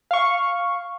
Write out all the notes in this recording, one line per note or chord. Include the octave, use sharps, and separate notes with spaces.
F5 C#6